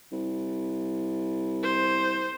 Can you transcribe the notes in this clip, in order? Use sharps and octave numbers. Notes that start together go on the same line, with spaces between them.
C2
C5